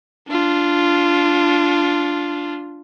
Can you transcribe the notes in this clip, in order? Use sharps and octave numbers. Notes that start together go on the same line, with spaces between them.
D4 F4